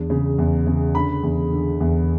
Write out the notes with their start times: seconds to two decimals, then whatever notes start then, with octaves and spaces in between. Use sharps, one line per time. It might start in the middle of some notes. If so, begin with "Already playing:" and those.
Already playing: E2 D4
0.10 C#3
0.38 E2
0.67 C#3
0.95 D3 B5
1.23 E2
1.52 D3
1.80 E2